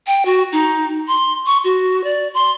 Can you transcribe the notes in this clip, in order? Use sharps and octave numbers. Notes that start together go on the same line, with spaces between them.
G5
F#4
D#4
C6
C#6
F#4
D5
C6